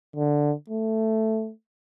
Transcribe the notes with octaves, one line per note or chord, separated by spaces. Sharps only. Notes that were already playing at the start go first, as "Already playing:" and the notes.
D3
A3